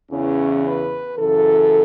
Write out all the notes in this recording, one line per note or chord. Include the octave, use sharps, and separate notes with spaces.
E2 C#3 E3 C#4
B4
F#2 C#3 E3 A4